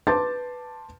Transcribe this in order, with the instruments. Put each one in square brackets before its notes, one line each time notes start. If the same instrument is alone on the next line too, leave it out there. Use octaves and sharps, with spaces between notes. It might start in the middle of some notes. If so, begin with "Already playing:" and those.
[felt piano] B4 A5 C6 D6 G6 A6